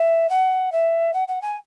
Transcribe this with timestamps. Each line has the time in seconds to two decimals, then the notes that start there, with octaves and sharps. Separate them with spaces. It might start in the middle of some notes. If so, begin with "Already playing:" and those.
Already playing: E5
0.29 F#5
0.72 E5
1.14 F#5
1.28 F#5
1.42 G#5